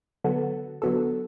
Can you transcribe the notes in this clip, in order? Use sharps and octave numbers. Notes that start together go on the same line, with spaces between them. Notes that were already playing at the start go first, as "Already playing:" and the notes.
D3 F#3 B3 F#4 A4
D3 F#3 B3 F#4 A4